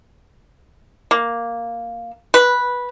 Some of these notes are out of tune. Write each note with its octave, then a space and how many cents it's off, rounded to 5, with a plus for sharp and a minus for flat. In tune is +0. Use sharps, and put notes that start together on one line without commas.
A#3 +0
B4 -10